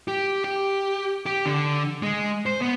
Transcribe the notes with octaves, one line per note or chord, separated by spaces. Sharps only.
G4
G4
G4
D3
G#3
C5
B3